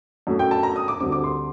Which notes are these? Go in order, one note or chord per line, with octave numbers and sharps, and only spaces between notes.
F#2 F#3 A3
G5
A5
A#5
D#6
D6
D2 D3 G3 C4 D6
D6
C6